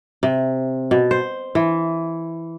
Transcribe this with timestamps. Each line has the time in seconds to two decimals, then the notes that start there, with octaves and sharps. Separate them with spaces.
0.23 C3
0.91 B2
1.11 C5
1.55 E3